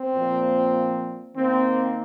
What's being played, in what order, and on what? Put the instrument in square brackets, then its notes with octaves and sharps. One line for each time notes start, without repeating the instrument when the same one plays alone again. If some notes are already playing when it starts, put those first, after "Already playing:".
Already playing: [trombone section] C4
A#2 F3 A#3
D#3 A#3 C4